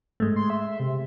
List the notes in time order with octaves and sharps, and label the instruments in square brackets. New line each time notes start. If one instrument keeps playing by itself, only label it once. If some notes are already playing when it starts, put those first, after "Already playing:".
[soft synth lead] G#2 [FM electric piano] G#3 A3
[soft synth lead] C6
E5
C3